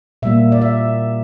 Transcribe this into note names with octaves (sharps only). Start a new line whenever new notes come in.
A#2 G3 A#3 E5
D5
E5